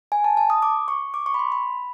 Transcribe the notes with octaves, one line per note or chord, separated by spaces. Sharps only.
G#5
A5
A5
D#6
D6
C#6
D6
C#6
B5
C6
B5